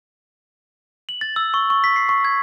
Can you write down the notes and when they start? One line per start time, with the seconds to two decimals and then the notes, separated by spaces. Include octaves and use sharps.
1.09 F#7
1.21 A6
1.36 E6
1.54 C#6
1.70 C#6
1.84 B6
1.96 C7
2.09 C#6
2.25 G#6